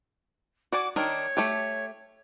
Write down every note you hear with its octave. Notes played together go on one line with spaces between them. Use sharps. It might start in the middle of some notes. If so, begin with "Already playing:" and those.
F#4 D5 G#5 D6
D#3 D4 A#4 C#5
A3 G4 A4